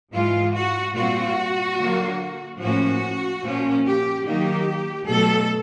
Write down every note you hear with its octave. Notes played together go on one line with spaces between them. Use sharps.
G#2 E3 G#3 F4
F#4
A#2 G3 C4 F4 F#4
D3 F#3 A#3
A2 F3 A#3 C#4 F#4
A#2 F3 A#3 C#4
G4
D#3 F#3 A#3 D#4 G4
B2 F#3 A3 A4